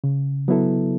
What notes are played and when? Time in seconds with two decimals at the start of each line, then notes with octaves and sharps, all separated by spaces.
0.04 C#3
0.48 F#3 B3 E4 A4